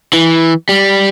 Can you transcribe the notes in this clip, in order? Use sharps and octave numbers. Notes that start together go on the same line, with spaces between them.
E3
G3